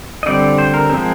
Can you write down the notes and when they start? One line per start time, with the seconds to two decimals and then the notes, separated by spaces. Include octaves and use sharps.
0.23 D#5
0.26 D3 G3 C4 D5
0.58 C5
0.74 A#4
0.89 F3 G#3 C4